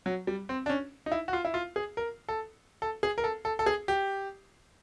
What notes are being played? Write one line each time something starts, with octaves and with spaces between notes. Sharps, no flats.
F#3
G3
C4
D4
C#4
D#4
E4
F#4
F4
E4
F4
G#4
A#4
A4
A4
G#4
A#4
A4
A4
A4
G#4
G4